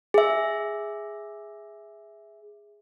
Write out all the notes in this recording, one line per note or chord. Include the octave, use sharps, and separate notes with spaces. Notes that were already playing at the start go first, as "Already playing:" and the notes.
G#4 E5